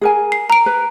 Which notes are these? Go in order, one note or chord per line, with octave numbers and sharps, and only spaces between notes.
G#4 A#4 G#5
C7
A#5 D7
B4